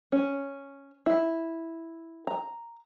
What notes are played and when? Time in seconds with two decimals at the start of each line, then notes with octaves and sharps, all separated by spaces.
0.12 C#4
1.06 E4
2.27 A#5